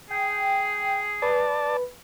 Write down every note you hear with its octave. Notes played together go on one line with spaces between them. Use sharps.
G#4 G5
B4 D5 A5